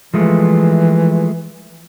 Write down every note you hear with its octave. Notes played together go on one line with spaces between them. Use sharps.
E3 F3 G#3 A3